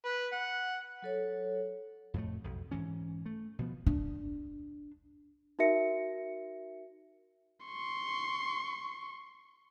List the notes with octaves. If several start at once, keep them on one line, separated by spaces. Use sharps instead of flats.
B4
F#5
F#3 A4 C#5
F2 A2 A3
B1 F2
G#2 E3 C#4
A3
B2 F3 B3
D4
D#4 F#4 A#4 E5 C#7
C6 C#6